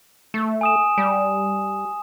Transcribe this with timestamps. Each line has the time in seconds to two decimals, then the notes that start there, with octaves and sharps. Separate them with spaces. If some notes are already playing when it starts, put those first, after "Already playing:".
0.34 A3
0.61 G#5 D#6 E7
0.98 G3